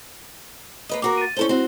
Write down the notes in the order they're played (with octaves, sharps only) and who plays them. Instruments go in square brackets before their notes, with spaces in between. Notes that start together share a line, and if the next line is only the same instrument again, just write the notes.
[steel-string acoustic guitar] A#3 B4 D#5
[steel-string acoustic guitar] A#3 F#4 A#4 [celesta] D6
[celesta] A6 D#7
[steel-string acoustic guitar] C#4 A4 C5 [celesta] E4 G7
[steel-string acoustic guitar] C4 F#4